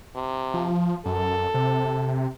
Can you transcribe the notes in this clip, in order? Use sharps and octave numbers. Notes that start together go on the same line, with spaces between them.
C3
F3
F#2 A4
C3